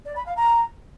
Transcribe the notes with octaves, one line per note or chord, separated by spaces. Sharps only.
D5
B5
F5
A#5